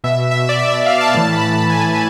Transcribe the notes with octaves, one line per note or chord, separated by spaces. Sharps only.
B2 E5
E5
D5
E5
E5
F5
A5
A2 E3 A5
B5
A5
G#5